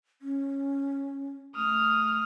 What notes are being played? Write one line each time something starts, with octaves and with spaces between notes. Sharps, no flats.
C#4
A3 D#6 F6